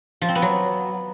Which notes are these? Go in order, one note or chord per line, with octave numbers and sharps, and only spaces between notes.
F3
C4
B3
F#3